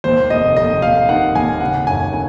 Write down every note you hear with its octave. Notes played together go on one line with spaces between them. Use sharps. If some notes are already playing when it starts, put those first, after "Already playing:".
D#2 C5
F1 D#5
F1 D#5
F1 F5
D#3 F#5
D#2 G#5
C#3 F#5
F#2 G#5
C#3 G#5